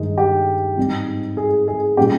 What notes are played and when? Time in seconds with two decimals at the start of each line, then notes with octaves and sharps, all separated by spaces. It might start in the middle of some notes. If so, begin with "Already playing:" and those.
Already playing: G2 D#3 G#3 D#4
0.18 G4
0.78 G#2 G3 C4 D#4
1.37 G#4
1.68 G#4
1.97 A#2 G3 C#4 G4